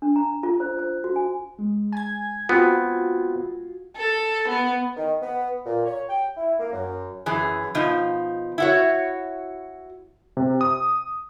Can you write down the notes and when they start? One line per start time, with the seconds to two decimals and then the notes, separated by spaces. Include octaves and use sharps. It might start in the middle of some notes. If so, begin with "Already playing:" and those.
0.02 D4
0.16 A#5
0.43 F4
0.60 C5
0.79 C5
1.04 F#4
1.16 G#5
1.59 G#3
1.92 G#5 G#6
2.49 B3 C4 F4 F#4
3.96 A4
4.48 B3
4.97 D#3
5.22 B3
5.66 A#2
5.86 C#5
6.09 G5
6.37 E4
6.60 A#3
6.73 F#2
7.26 F#2 E3 G#4
7.75 B2 F3 D#4
8.58 E4 F#4 C#5
10.37 C3
10.61 D#6